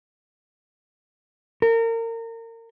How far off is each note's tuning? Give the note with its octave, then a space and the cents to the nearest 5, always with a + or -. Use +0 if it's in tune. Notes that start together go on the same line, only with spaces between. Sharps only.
A#4 -30